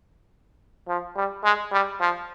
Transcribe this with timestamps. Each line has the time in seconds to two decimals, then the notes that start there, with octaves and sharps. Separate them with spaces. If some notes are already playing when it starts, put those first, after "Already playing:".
0.88 F3
1.16 G3
1.44 G#3
1.72 G3
2.00 F3